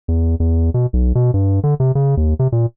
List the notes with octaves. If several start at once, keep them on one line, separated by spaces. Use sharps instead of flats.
E2
E2
B2
B1
B2
G2
D3
C3
C#3
D#2
C3
A#2